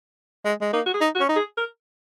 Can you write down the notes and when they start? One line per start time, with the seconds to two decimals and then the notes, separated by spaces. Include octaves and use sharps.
0.45 G#3
0.61 G#3
0.73 A#3 D#4
0.86 F#4
0.94 G#4
1.01 D#4
1.15 F#4
1.21 C#4
1.29 D#4
1.36 G#4
1.58 A#4